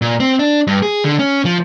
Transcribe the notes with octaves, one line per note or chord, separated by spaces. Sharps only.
A#2
C4
D4
G2
G#4
D3
C#4
F3